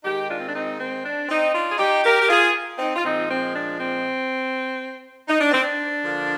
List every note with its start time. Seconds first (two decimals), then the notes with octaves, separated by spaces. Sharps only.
0.03 D#3 G#3 D#4 G4
0.28 D4 F4
0.38 C4
0.46 D4
0.53 C4 D#4
0.78 C4
1.04 D4
1.28 C4 D#4
1.53 D4 F4
1.69 G#4
1.78 D#4 G4
2.04 G4 A#4
2.21 G4
2.29 F4 G#4
2.78 C4 D#4
2.96 F4
3.03 A#2 F3 G#3 C4 D#4
3.29 C4
3.53 D4
3.78 C4
5.28 D#4
5.40 D4
5.51 C4
5.62 D4
6.03 D3 F3 A#3